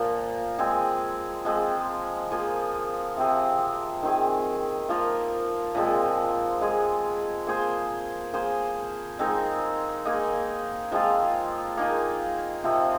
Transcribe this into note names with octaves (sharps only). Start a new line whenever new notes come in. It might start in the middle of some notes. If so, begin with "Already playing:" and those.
Already playing: A#2 F3 A#3
G#3 C4 G#4
F3 G#3 C4
F3 A#3 G#4
C3 F3 C4 G#4
D#3 C4 G#4
F3 A#3 F4 A#4
A#2 F3 G#3 C4
G#3 F4 G#4
A#3 G#4 C5
A#3 G#4 C5
G#3 C4 D#4 A#4
A#3 D#4 G#4
F3 G#3 C4 F4
A#3 D#4 G#4
C3 F3 C4